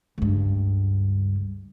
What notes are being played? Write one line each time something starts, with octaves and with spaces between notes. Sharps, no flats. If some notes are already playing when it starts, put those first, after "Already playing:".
C#2 G2